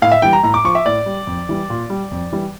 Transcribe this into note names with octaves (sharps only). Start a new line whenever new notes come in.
A2 F5
E5
E3 G3 G5
A#5
A2 A#5
D6
F3 C#6
E5
A2 D5
G3
F2
E3 G3
A#2
G3
F2
E3 G3